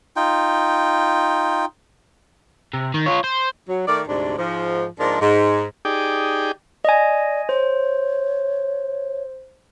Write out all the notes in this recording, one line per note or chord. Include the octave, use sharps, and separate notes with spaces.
D#4 F4 G5
C3
D#3
F4 C#5
C5
F#3
D#3 A3 A#4 D5
D2 G#2 C3 D4
G#2 F3
G#2 F3 G#3 A#3 D4
G#2
D#4 G4 G#4 D5 G5
D5 D#5 G#5
C5 C#5